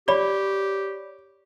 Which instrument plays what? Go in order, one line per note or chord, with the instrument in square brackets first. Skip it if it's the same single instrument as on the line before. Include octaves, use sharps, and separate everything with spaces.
[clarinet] G4 [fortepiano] C#5 [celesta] D5 B5